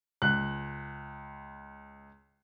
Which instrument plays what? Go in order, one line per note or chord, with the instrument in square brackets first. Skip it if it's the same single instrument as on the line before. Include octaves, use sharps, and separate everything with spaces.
[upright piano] C#2 F#6